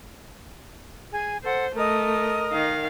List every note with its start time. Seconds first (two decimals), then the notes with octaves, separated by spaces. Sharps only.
1.12 G#4 G#5
1.44 A4 C5 F#5
1.76 A3 A#4 D#5 D#6
2.52 D#3 F5